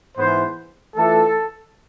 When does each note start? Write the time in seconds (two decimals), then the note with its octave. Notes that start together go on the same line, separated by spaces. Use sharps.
0.17 G#2 E3 B3 C5
0.95 E3 A3 D4 F4 A4